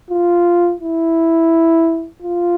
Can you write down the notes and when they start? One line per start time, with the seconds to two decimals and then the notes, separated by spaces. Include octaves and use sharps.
0.11 F4
0.81 E4
2.22 F4